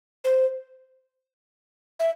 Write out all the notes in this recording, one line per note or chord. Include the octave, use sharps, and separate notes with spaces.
C5
E5